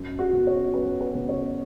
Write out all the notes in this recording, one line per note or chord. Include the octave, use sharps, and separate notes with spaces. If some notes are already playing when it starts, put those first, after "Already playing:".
Already playing: F#2
F#4
C#3 B3
C#5
F#2 B4
B4
C#3 B3
C#5